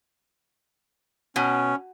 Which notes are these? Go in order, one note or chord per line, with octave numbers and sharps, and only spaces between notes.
B2 C#4